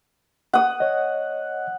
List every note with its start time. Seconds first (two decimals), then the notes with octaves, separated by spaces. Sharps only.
0.53 F#5 D#6
0.80 C#5 D#5